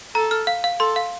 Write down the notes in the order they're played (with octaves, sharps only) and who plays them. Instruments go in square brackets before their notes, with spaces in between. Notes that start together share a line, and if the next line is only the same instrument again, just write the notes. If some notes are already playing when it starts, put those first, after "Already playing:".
[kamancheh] A4 [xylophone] A#5
[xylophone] F6
F5
F5
[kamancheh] A4 [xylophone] C6
[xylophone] F5